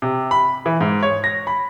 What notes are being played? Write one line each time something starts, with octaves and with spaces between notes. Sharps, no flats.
C3
B5
E3
G#2
C#5
A#6
B5